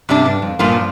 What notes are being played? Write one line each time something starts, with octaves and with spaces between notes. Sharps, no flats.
G2 C3 G3 D4
G2
F2
G2 A#2 F3 A#3 F4